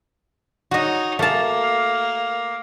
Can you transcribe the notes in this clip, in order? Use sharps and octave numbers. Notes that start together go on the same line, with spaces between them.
D#4 F#4 C#5 D#5
A3 A#3 A5